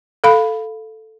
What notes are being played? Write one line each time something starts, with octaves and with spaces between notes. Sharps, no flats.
A4 F5 B5